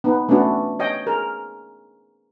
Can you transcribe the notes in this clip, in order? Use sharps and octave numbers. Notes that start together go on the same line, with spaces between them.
B3 D#4
A3 B3 C#4 D4 F#4
C#5 D#5 G5
G#4 A#4